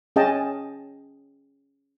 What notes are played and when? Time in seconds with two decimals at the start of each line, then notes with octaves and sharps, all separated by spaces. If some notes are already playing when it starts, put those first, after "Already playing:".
0.16 C#4 G#4 D#5 G5 A5